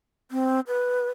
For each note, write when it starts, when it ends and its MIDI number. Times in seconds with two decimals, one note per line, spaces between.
0.31 0.60 60
0.68 1.08 71